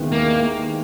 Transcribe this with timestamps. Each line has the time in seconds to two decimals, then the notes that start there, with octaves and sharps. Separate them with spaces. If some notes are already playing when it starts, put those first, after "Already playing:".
Already playing: D#2 D#3 G#3 B3 E4
0.12 A#3